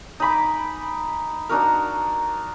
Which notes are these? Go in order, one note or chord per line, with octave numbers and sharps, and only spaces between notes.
D#4 G#5 B5 D6
D4 D#4 F#4 A#4